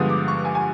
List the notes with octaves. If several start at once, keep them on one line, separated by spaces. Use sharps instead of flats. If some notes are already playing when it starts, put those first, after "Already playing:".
Already playing: G2 D3 F3 G#3 B3 D#6
D6
C#6
G#5
G#5